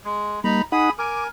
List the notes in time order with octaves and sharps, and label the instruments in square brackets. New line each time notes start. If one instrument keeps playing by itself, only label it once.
[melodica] G#3
[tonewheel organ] G3 A#3 [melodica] D#4 A#5 B5
[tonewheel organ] D#4 F#5 [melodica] G#4 B5 D#6
[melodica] A#4 G#5 [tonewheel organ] D6